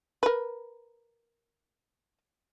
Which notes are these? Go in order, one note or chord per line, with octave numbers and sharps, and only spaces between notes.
A#4 B4